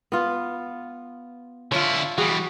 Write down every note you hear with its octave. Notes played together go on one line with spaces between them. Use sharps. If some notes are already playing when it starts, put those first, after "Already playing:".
B3 F4 B4
D3 E4 F4 C#5
E3 G3 F#4 G#4